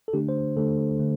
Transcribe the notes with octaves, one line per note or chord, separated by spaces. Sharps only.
A4
D3 A3 D4 G4
C5
D3 A3 D4 A4
D3 A3